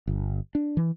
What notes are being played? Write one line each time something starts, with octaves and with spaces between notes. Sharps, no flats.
G1
D4
E3